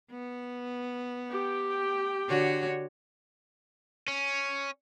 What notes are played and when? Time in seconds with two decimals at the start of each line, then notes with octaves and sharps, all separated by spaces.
0.11 B3
1.31 G4 G5
2.28 D3 F#4 C#5
4.08 C#4